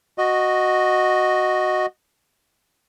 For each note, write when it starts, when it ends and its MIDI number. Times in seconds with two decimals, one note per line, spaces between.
0.18 1.86 66
0.18 1.86 75